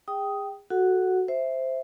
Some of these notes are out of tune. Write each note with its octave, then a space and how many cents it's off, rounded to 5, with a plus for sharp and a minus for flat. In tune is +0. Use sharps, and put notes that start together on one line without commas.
G#4 -35 G5 -5 D#6 +5
F#4 +0 A4 -10 F#5 +0
C5 +0 E5 +0